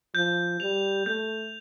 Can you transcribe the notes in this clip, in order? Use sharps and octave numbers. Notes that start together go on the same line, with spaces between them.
F3 G6
G3 F7
A3 G6